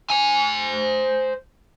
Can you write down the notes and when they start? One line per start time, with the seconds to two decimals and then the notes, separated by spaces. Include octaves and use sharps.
0.10 C5 G#5